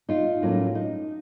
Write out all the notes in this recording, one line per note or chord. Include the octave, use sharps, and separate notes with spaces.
D#4 F4
A2 F#3 A#3 C#4
D#4